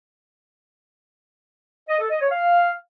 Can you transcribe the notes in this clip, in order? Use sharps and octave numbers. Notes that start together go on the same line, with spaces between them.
D#5
A4
D#5
C#5
F5